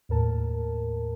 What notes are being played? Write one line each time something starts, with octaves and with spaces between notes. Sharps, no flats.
D#2 A2 A#4 A5